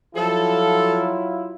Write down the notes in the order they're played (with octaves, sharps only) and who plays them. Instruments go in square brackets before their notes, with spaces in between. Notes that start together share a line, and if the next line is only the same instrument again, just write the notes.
[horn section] F3 A4 [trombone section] F#3 E4 F4